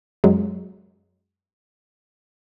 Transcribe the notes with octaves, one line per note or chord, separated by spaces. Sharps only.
F#2 F#3 G#3